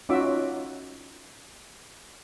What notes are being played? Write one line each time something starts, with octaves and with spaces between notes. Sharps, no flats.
C#4 D#4 F4 F#4 E5 D6